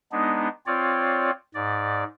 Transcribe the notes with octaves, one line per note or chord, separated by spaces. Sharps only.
G#3 B3 D4 D#4
C4 F4 C#5 D5
G#2 D5